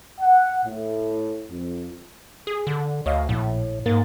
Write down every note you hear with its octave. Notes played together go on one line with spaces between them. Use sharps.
F#5
A2
F2
G#4
D3
D2 C#5 D#5 F5
A#1 A2
G#2 A#3 A6